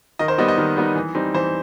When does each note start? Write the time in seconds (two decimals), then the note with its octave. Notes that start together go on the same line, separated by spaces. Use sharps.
0.19 D#3 D#5
0.28 C5
0.38 G3 B3 D#4 D#5
0.48 D#5
0.58 D#3
0.77 G3 B3 D#4
0.95 E3
1.15 G3 C4 D#4
1.34 E3 C5